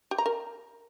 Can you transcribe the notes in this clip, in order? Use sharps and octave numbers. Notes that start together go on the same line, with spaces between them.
G4
A#5
A#4